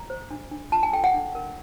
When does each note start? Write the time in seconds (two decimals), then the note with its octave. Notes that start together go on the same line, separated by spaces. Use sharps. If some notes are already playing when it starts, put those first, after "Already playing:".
Already playing: A#5
0.10 C5
0.31 D4
0.51 D4
0.72 F4 A5
0.83 G#5
0.93 A4 G5
1.04 F#5
1.14 D4
1.35 A#4